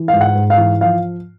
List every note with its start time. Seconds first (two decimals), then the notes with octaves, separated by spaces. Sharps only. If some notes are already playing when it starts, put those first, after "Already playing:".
Already playing: E3
0.08 F5
0.13 G#2
0.21 F#5
0.35 G#2
0.50 F5
0.58 E3
0.81 F3 F5